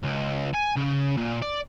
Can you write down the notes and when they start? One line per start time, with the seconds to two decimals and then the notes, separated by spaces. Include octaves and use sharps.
0.03 C#2
0.54 G#5
0.76 C#3
1.17 A#2
1.42 D5